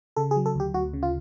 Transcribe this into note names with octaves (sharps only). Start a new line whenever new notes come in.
C#3 A4
G#4
F#3
A4
D2 G4
D2 F#4
C#3
F4